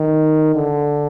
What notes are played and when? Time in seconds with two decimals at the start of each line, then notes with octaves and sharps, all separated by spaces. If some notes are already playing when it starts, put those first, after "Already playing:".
Already playing: D#3
0.56 D3